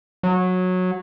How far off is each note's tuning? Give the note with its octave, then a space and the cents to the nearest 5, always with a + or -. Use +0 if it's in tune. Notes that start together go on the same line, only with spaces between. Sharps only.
F#3 -15